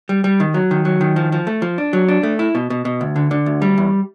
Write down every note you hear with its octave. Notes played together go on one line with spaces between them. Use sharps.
G3
G3
D#3
F#3
D#3
F#3
D#3
F3
F3
A3
F3
D4
F#3
D4
A3
E4
B2
B2
B2
D2
D3
D3
D2
G3
E2